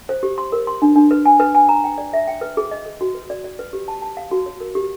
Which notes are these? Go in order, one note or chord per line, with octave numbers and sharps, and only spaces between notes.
C5
G4
C6
A#4
C6
D4
D4
B4
G#5
B4
G#5
A#5
G5
D5
E5
G5
B4
G#4
D#5
G#4
F#4
B4
D5
D5
B4
G4
A5
A5
F5
F#4
C#5
A#4
G4